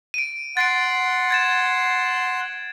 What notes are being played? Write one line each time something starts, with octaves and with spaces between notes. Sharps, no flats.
D7 D#7
F#5 C6 A6 C7 D7
G#6 A6 E7